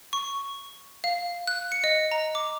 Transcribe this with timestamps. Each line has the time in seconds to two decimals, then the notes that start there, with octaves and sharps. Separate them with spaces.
0.13 C#6
1.04 F5
1.47 F#6
1.72 C#7
1.84 D#5
2.11 A#5
2.35 D6